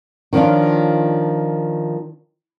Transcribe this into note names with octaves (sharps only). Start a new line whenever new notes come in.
D#3 F3 C#4 D4 F4